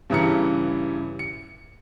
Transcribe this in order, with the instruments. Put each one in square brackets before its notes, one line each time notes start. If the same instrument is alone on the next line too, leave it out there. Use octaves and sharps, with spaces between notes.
[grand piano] G2 C#3 E3 E4 A#5 C#7
C#7